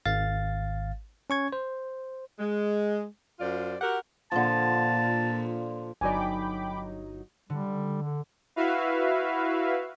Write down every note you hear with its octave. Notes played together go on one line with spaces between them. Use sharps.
G#1 F5 A6
C#4 C#6 G#6
C5
G#3
F#2 F4 C5 D5
F#4 G4 A#4 F#5
A#2 D3 F3 A5
G1 F#3 D#4 D5 G5 G#5 B5 D6
D3 G3
D3
E4 F#4 B4 E5 F5